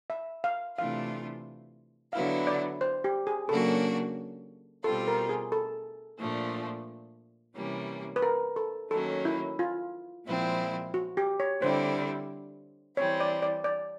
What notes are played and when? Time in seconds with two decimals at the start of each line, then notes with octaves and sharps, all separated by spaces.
0.10 E5
0.44 F5
0.77 C3 E3 A3 D4 F4 F5
2.13 D3 F#3 B3 E4 F5
2.47 D5
2.81 C5
3.04 G4
3.27 G#4
3.49 C#3 F#3 A#3 D4 F#4 A4
4.84 B2 G3 C4 F4 A4
5.08 A#4
5.29 G#4
5.52 A4
6.19 A#2 F3 A3 D4
7.55 C3 E3 G3 A#3 C#4
8.16 B4
8.22 A#4
8.56 A4
8.91 D#3 F#3 A#3 C#4 A4
9.25 E4
9.59 F4
10.26 A#2 F3 G#3 C4 E4
10.94 F#4
11.17 G4
11.40 C#5
11.62 D3 G3 C4 E4 C5
12.97 E3 G3 C4 C#5
13.20 D5
13.42 D5
13.64 D5